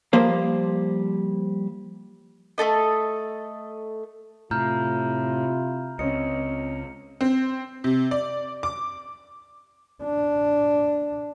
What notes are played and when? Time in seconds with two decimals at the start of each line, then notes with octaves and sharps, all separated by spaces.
0.13 F3 G3 A#3 C5 F5
2.58 A3 C4 A4 D#5
4.51 A2 C3 E4 F4 A#5 F6 G6
5.99 C#2 C4 C#4 D#5 C#7
7.21 C4
7.84 C3
8.11 D5
8.63 D6
10.03 D4